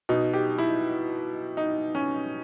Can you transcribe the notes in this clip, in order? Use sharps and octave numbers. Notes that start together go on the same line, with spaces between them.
B2 D#4
G4
E4
D#4
C#4